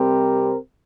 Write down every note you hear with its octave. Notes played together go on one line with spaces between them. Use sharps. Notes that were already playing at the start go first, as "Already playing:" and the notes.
Already playing: C3 G3 C4 G4 A#4